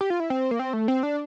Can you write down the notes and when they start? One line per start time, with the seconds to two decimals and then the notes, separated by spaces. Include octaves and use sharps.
0.01 G4
0.10 F4
0.20 E4
0.30 C4
0.51 A#3
0.59 C4
0.73 A3
0.88 C4
1.03 D4